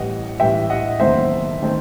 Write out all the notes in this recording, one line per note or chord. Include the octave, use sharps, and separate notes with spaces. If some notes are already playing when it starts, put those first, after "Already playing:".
Already playing: A1 A2 E3 G3 D#5 F#5
A1 A2 E3 G3 E5 G5
D#5 F#5
F#1 E2 D#3 A3 C4 C5 E5
D#3 A3 C4